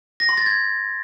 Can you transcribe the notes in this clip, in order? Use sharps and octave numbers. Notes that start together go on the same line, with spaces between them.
A#6
C6
A6
G#6